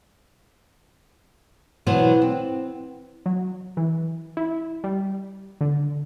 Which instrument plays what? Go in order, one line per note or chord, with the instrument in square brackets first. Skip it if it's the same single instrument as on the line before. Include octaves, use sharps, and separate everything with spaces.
[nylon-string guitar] B2 E3 F#3 B3 C5 F#5
C4
[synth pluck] F#3
E3
E4
G3
D3